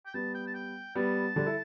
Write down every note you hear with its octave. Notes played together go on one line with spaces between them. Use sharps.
G5
G3 B3 A5
G5
A5
G5
G3 B3 A5
D3 G3
E4 A4